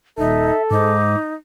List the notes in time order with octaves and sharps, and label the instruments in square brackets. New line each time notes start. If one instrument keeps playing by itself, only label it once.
[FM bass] D#1 [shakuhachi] D#4 [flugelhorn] A4 [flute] E5
[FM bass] G#2 [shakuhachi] D#4 [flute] D6